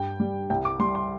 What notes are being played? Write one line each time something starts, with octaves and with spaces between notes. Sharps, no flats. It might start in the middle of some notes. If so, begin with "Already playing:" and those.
Already playing: G2 G3 G5
G3
C2 G5
D6
G3 C6
C6